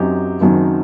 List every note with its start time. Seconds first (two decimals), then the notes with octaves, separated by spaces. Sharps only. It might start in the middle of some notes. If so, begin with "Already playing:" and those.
Already playing: F#2 F#3 C4 D#4 G4
0.40 F#1 F#2 D#3 F#3 C4